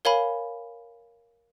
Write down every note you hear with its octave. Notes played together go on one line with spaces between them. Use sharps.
A#4 C#5 F5 G#5 B5